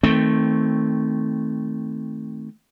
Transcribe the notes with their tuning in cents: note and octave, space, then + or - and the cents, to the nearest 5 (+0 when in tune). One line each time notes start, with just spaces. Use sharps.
D#3 +25 A3 +0 C4 +0